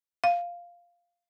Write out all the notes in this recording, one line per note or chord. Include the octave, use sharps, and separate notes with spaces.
F5